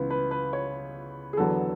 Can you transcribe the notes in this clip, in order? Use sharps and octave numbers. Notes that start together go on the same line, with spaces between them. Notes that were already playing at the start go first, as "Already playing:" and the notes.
Already playing: C#2 C#3 E3 B3 B4
B4
B4
C#5
G#4
E2 D3 F#3 B3 A4